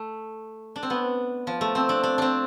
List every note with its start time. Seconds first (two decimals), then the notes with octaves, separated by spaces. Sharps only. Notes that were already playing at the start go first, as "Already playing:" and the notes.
Already playing: A3
0.76 D4
0.83 C4
0.90 B3
1.47 F3
1.61 A3
1.75 C4
1.89 D4
2.03 D4
2.18 C4 D4